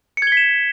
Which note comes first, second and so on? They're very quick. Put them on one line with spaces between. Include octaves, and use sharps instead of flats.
C#7 G#6 G7 B6 E7